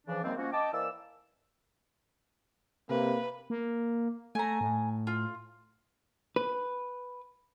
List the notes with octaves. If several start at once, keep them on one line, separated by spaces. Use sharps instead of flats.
C#3 E3 F3 D4
F#2 D#3 F3 G3 A#3 C4
F3 A#3 C#4 F#4
D#5 G5 A5 D6
E3 A#3 C5 D5 E6
C3 A#3 B4
A#3
A3 G#5 A#5
A2
F4
B4